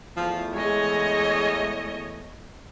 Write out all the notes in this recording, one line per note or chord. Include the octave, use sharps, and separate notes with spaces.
E2 E3 F3 A3
G#3 C#5 D#5